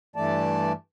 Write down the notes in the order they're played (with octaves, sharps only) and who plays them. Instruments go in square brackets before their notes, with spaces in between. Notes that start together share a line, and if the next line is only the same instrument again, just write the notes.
[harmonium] G2 E3 A3 D5 A5